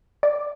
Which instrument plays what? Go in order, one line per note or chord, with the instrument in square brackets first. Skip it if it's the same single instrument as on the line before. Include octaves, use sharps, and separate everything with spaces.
[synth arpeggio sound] D5